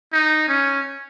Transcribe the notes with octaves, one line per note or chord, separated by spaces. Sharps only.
D#4
C#4